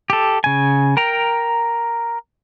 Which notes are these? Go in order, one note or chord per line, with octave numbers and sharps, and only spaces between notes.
G4 A4
C#3 G#5
A#4 G5 A#5